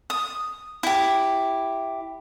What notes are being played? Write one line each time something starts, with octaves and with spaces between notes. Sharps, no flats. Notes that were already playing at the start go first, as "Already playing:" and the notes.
D#6
E4 G4